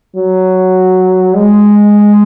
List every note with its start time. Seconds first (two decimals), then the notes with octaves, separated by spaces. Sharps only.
0.16 F#3
1.36 G#3